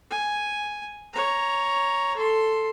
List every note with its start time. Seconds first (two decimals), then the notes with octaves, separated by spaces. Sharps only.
0.11 G#5
1.13 C#5 A#5
2.16 A4 C6